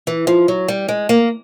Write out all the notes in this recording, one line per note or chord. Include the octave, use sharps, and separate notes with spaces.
E3
F3
F#3
G3
G#3
A#3